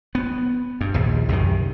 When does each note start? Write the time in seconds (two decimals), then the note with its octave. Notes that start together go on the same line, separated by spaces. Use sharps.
0.15 B3
0.81 G2
0.94 A#1 D#2
1.28 C2 F#2 C3 D#3